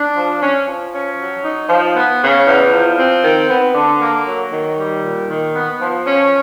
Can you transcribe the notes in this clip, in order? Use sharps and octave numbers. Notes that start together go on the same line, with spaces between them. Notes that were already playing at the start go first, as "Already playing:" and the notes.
Already playing: D4
F3
C#4
F3
C#4
F#3
D#4
F3
B3
C#3
E2
F3
C4
D#3
B3
D3
A#3
F#3
D#3
G3
A#2
D#3
B3
F3
C#4